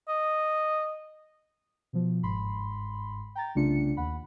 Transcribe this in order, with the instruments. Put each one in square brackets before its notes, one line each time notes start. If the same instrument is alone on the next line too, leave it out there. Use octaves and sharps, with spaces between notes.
[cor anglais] D#5
[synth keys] B2 F3
G1 G#2 B5 C6
G5 A#5 A6
C2 C#3 A3 D4 F4 C#7
D#2 F#5 B5